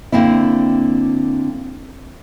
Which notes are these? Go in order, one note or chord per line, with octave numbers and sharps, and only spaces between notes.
D3 A#3 C4 D4 E4